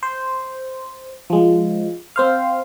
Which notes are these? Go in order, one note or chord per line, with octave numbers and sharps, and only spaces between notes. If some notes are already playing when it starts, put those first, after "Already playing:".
C5
F3 G#3
C4 C5 F5